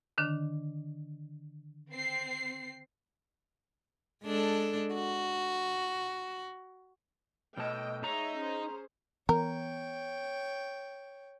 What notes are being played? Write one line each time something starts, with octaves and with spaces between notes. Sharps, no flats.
D3 D#3 D4
C4 C7
G#3 D4 A4
F#4
B2 A3 D#5 G5 A5
G#3 D#4 C#5 E5 A#5
C#4 G#4 C5
E3 B3 A#4 C#5 G5